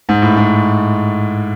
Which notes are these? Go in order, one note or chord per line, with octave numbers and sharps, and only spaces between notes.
G#2
A2
G#2